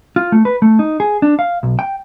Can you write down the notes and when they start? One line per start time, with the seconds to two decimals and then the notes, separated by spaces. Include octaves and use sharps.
0.16 F4
0.32 A3
0.45 B4
0.62 A3
0.79 D#4
1.00 G#4
1.22 D4
1.39 F5
1.63 B1
1.79 G5